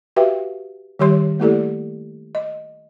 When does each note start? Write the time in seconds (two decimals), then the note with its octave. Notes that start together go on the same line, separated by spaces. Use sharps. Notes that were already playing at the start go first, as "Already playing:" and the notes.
0.16 F#4 G4 B4 E5 F5 G5
0.99 D#3 G3 G4 C#5 C6
1.40 A3 A#3 E4 G4 A4 D5
2.35 D#5